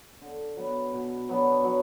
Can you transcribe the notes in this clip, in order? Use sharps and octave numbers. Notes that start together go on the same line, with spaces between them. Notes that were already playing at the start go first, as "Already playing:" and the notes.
D3
F#3 B3
B2
F#3 B3 D4
F#3